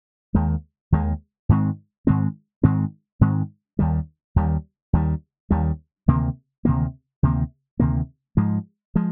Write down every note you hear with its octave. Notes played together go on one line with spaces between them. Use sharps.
D#2 D#3 G#3
D#2 D#3 G#3
G#2 D#3 G#3 C4
G#2 D#3 G#3 C4
G#2 D#3 G#3 C4
G#2 D#3 G#3 C4
D#2 D#3 G3
D#2 D#3 G3
D#2 D#3 G3
D#2 D#3 G3
D2 C3 D#3 A#3
D2 C3 D#3 A#3
D2 C3 D#3 A#3
D2 C3 D#3 A#3
G#2 F3 G#3
F3 G#3